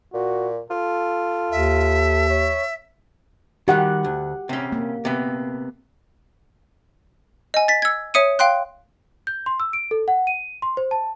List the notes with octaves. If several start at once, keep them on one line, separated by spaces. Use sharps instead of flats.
A#2 F#4
F4 A4
D#2 E5
C#5
D#3 G3 G4 F#5
D2
C3 C#4
A#3
C3 B3
D#5 G#5
A6 B6
E6 G#6
C#5 E5 D#6 C#7 D#7
F5 G5 C6 F#6
G6
C6
E6
D7
A4
F#5
D#7
C6
C5
A5